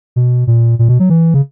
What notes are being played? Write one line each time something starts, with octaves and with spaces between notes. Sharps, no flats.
B2
A#2
A#2
B2
F#3
E3
C#3